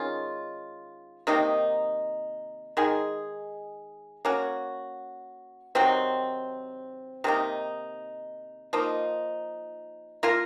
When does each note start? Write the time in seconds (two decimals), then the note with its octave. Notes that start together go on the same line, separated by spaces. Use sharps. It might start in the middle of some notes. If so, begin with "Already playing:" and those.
Already playing: D#3 G#3 C#4 F4
1.27 C3 D#3 A#3 D#4
2.77 D#3 G#3 D#4 G#4
4.25 A#3 C#4 F#4
5.75 C3 D#3 F#3 C4
7.24 C3 D#3 A#3 D#4
8.73 F3 A#3 D#4
10.23 A#3 F4 A#4